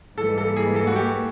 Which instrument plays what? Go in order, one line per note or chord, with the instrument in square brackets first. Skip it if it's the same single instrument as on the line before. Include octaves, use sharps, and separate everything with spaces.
[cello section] G#2 E3 G3 A#3 [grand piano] A4
[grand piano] A4
G#4
A4
F#4
G4